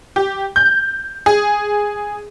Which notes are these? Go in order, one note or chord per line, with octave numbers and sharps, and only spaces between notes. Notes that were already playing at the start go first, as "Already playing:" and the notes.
G4
G6
G#4